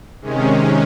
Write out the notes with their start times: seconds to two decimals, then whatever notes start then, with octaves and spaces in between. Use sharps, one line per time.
0.21 C3 D#3 G#3 C#4